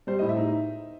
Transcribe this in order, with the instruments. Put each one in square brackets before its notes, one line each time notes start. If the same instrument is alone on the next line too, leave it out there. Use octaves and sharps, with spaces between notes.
[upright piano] G3 [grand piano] C5
[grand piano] D#5
[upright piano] A2
[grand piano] E5
[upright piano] D#4